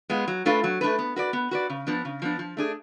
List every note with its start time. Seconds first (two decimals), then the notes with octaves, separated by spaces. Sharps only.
0.10 G#3 B3 F4
0.28 F#3
0.46 A3 D4 F4 B4
0.64 F#3
0.81 A3 D4 F4 B4
0.99 B3
1.16 F#4 B4 D5
1.33 B3
1.51 F#4 B4 D5
1.70 C#3
1.87 F3 B3 D4
2.05 C#3
2.22 F3 B3 D4
2.39 F3
2.57 A3 D4 G#4